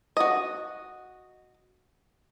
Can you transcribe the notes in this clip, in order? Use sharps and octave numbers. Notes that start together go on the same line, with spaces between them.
F#4 D#5